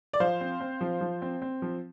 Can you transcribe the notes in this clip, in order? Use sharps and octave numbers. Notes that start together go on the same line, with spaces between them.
D5
F3 C5 F5
C4
C4
F3
F3
C4
C4
F3